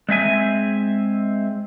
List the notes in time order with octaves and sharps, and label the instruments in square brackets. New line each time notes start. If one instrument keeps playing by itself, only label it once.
[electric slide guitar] G#3 C4 E5 G#5